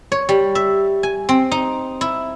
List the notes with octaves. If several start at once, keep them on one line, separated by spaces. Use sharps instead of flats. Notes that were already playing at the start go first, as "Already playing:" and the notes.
C#5
G3
E5
G#5
C4
D#4
E4